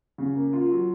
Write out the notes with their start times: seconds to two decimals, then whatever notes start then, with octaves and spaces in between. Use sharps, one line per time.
0.18 C#3
0.36 A#3
0.53 F4
0.71 F#3